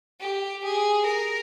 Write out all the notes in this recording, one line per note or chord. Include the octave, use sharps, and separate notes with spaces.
G4
G#4
A#4